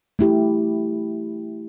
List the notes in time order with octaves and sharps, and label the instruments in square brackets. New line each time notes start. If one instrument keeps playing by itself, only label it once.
[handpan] A3 E4 G4